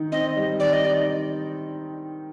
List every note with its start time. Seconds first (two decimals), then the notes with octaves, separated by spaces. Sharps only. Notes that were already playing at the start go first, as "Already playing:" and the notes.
Already playing: D#3 D#4
0.12 C4 D#5
0.36 G3
0.60 D#3 D5
0.73 D#5
0.83 D#4 D5